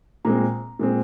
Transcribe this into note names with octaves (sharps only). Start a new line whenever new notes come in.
A#2 G#3 C4 A#5
A#2 G#3 C4